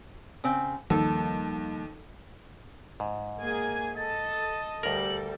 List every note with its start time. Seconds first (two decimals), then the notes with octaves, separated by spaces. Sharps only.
0.44 C#3 C4
0.90 D#2 F3 G3 A#3 A4
3.00 G#2
3.40 A#3 G#4 G#5
3.97 A4 D#5 A5 A6
4.83 D2 G3 A4 A#4 F#7